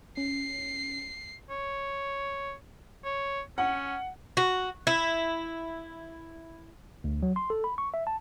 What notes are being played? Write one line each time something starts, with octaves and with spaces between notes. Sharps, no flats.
C#4 C7
C#5
C#5
C#4 F#5
F#4
E4
D2
F#3
C6
A4
B5
C#6
E5
A5